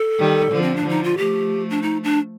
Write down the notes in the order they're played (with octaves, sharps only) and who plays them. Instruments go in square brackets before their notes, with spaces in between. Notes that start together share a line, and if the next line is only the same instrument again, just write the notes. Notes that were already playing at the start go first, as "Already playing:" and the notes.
Already playing: [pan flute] A4
[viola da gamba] D#3 G3
D3 F3
[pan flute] C4
D4
[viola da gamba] D3 F3 [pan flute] D#4
[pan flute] F4
[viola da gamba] F3 A3 [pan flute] G4
[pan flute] D4
D#4
D4